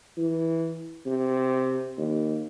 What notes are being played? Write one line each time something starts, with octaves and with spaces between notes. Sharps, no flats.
E3
C3
D#2